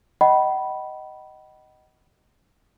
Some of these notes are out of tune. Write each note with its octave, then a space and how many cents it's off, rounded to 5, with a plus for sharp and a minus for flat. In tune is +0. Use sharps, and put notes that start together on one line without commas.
D#5 +0 F#5 +45 B5 -10